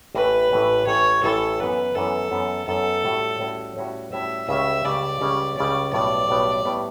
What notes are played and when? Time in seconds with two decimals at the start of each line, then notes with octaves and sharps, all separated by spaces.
0.15 A1 A2 E3 B4
0.52 A1 A2 E3
0.87 A1 A2 E3 C#5
1.24 A1 A2 E3 A4
1.60 F#2 E3 B3 B4
1.95 F#2 E3 B3 A4
2.31 F#2 E3 B3
2.68 F#2 E3 B3 A4
3.04 A2 G3 C#4 F#4
3.40 A2 G3 C#4 F#4
3.77 A2 G3 C#4 F#4
4.13 A2 G3 C#4 F#4 E5
4.48 C#2 C#3 G3 C#4 G4 E5
4.85 C#2 C#3 G3 C#4 G4 D5
5.21 C#2 C#3 G3 C#4 G4
5.57 C#2 C#3 G3 C#4 G4 D5
5.93 B1 A2 G3 B3 D5
6.29 B1 A2 G3 B3
6.65 A2 G3 B3